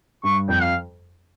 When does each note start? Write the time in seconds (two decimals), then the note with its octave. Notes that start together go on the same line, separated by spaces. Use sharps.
0.24 G2 C#6
0.48 F2 G5
0.61 F5